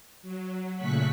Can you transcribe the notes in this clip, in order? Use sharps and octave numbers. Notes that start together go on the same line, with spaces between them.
F#3
A#2 C#3 A3 C#6 F#6 B6